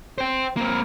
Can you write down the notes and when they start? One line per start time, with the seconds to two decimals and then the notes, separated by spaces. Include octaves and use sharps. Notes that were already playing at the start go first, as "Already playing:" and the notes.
0.18 C5 G5
0.57 A#3 C4